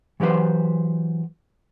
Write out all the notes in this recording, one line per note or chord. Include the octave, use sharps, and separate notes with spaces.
E3 F#3 G4 B4 C5